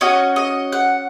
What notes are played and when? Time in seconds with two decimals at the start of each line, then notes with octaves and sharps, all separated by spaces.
0.01 C#4 F#4 D#5
0.36 D#5
0.73 F#5